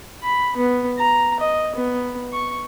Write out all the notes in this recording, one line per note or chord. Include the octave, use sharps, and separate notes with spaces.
B5
B3
A#5
D#5
B3
C#6